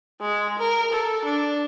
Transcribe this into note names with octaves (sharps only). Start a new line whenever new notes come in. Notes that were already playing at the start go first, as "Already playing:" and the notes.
G#3
A#4
A4
D4